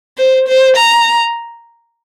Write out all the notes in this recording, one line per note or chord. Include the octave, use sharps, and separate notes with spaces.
C5
C5
A#5